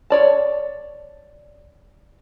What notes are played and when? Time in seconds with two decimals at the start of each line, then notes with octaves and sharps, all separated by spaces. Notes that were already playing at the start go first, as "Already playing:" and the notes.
0.10 C#5 D5 A5